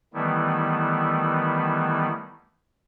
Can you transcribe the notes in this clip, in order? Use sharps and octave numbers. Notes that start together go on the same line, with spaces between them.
D#3 E3 G3 A3 B3 E4